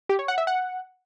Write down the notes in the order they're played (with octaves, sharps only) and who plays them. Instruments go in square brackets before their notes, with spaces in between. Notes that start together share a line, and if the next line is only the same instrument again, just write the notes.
[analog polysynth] G4
C#5
F#5
E5
F#5